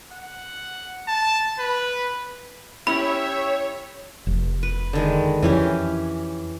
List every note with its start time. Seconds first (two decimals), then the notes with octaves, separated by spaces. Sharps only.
0.13 F#5
1.08 A5
1.59 B4
2.87 C#4 E4 G4 C#5 E5 F#5 B5
4.27 F1
4.63 B4
4.93 D3 D#3 G#3
5.42 F2 E3 C#4 G4